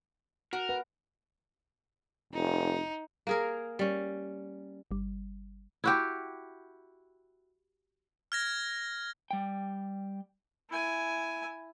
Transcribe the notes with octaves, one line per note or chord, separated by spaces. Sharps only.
F#4 A#4
B4 F#5
F1 D#4
A#3 G#4 A#4
G3 C#4
G1 G3
E4 F#4 G4
F6 G#6 A#6
G3 G5
E4 G#5